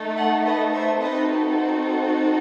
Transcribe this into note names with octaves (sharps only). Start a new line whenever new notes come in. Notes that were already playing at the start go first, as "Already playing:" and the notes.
Already playing: A3 D#4 A4
D#5 F#5
B4 D#5
C5 E5
C4 D#4 F#4 A4 B4 D#5
C5